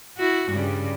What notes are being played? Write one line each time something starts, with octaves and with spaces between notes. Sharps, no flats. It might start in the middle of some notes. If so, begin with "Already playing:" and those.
E4 F#4
G2 C#3 G3